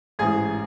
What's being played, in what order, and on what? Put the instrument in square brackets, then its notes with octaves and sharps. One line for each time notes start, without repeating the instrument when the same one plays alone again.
[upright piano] A1 G#2 E3 [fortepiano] G#4